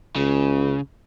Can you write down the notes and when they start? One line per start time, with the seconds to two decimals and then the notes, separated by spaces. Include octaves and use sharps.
0.16 C#2 C#3